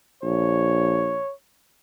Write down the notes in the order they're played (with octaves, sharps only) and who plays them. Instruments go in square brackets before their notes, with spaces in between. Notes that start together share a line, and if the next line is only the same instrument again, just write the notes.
[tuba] A#1 [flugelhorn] C#5